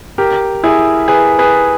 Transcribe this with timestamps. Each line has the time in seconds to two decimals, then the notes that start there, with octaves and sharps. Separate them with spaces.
0.18 G4 A#4
0.64 E4 G#4
1.08 G#4 B4
1.39 G#4 B4